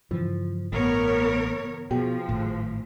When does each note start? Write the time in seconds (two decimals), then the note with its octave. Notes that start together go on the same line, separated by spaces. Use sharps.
0.11 G2 C#3 E3 F3
0.73 A1 B3 A#4 C#5
1.91 B2 F3 F#4 G#4 G5
2.29 G#1 A2